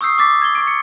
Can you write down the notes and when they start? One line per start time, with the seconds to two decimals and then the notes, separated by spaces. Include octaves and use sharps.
0.01 C#6 D#6 E6 G6 C7
0.18 C#6 D6 A6 B6
0.42 G#6 G7
0.55 C#6 D7
0.67 C#7